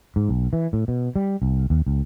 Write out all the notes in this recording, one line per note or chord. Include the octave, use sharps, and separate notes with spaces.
G#2
B1
E3
A2
B2
G3
C2
D#2
C#2